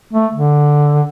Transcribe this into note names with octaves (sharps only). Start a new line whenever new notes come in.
A3
D3